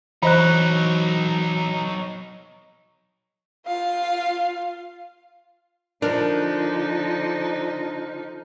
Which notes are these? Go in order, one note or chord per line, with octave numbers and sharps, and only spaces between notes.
E3 F#3 D#4 C5 D#5 A#5 B5 F#6
F4 F5
D3 F3 D4 D#4 A#4